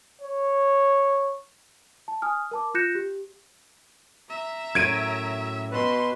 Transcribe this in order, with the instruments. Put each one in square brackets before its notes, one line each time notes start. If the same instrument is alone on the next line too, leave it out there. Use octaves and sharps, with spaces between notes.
[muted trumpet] C#5
[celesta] A5
G#5 D#6 F6
A#4 A5 D6
F4 F#6 G6 A#6 C#7 E7
G4
[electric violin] E5 A#5
[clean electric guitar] F#2 A2 [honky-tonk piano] G#6 D7 D#7
[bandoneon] B2 B4 [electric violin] F#4 C6